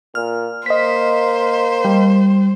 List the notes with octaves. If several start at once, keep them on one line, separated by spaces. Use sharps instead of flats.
A#2 F6
A#3 C5 D#5 B6
G3